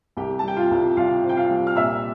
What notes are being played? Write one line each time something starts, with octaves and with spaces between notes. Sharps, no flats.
C2 G4 G5
A5
G3 G5
F4 F5
C2
C2 F4 F5
C4
G5
F4 F5
G3
F6
A#2 E5 E6